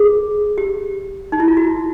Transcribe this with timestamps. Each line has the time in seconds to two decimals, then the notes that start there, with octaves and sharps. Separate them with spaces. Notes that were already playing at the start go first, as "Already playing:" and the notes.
Already playing: G#4
0.58 G4
1.32 D#4
1.40 E4
1.48 F4
1.57 F#4